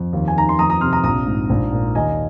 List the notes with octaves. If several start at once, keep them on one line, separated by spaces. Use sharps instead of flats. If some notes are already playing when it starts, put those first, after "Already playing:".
Already playing: F2
D#2
G#5
D#3 A#5
C6
F2 A#5 D#6
A#5 D#6
C3 C6 F6
A#5 D#6
A#1 A#5 D#6
G#2
A#1
A#2
D#2 D#5 G#5